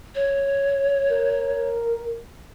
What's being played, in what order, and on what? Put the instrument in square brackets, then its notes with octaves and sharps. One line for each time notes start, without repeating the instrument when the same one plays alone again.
[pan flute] C#5
[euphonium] A#4